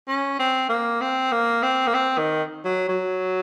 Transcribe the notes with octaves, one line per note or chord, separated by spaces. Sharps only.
C#4
C4
A#3
C4
A#3
C4
A#3
C4
D#3
F#3
F#3